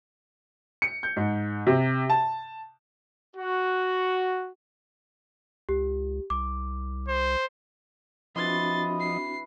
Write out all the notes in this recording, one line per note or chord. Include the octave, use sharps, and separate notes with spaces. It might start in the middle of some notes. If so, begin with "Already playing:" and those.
C#7
G6
G#2
C3
A5
F#4
C#2 G4
C2 D6
C5
E3 F3 C4 D4 F#4 D#5 C6 A6
C7